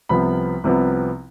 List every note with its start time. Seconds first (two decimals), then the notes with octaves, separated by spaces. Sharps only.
0.09 C2 C3 F3 B3 B5
0.64 C2 C3 F3 B3